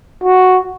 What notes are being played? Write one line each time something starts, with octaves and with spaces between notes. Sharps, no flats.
F#4